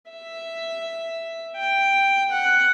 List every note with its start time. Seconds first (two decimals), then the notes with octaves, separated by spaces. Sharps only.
0.11 E5
1.57 G5
2.30 F#5